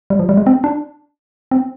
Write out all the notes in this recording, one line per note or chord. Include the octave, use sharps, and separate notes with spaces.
G3
F3
G3
G#3
C4
D4
C4